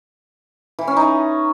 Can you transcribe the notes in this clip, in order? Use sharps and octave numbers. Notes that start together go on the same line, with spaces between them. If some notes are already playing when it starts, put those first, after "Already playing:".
E3
C#4
D#4